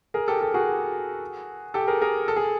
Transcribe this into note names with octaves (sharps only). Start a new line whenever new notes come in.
G#4 A#4
G4 A4
G4 A4
F#4 G#4
G4 A4
G#4 A#4
G#4 A#4
A4
G#4